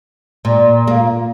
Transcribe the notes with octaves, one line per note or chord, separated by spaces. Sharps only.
A#2
A#3